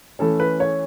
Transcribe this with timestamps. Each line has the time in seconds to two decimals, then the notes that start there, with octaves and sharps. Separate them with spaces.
0.19 E3 A3 C#4 A4
0.40 B4
0.60 C#5